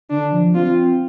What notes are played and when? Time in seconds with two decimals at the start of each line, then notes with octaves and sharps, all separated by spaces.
0.10 D3 D4
0.32 F3
0.55 C4 F4